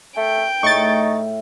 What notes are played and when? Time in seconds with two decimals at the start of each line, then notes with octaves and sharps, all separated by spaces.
0.17 A3 G5
0.63 A2 D#4 C#6 A6